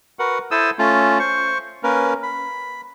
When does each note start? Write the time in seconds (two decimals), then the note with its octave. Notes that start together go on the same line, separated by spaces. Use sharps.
0.19 F#4 A#4 B4 F#5
0.51 E4 A4 C5 D#6 E6
0.79 A3 C#4 F4
1.19 C5 C#6
1.83 A#3 C#4 A#4 B4
2.23 B5